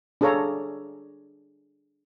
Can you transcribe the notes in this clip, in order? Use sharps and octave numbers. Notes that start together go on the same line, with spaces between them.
D4 G#4 A4 C#5 F5 A#5